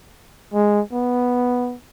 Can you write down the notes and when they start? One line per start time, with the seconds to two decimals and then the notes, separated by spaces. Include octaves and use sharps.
0.54 G#3
0.93 B3